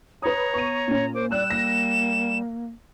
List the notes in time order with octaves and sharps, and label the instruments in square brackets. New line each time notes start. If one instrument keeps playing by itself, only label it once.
[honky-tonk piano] B4 D#6 [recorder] C#5 [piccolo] A#5
[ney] B3 [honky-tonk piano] C#6 D#7
[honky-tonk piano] A#2 C#4
[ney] A#4 [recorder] C5 [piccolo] D6
[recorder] G3 [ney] D5 [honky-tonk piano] E6 F#6 [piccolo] E7
[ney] A#3 [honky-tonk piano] A#6